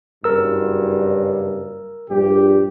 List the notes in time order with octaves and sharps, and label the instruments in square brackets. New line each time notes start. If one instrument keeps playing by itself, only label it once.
[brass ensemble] F#1 G2 [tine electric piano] A#4 E6
[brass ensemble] A#1 G2 G4